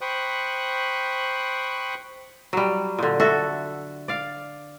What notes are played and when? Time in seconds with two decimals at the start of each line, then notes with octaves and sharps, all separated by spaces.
0.01 C5 G5 B5 C#6 D#6 F#6
2.53 F#3 G3
2.98 A#2 D3
3.20 F#4 A4 E5
4.08 D5 F5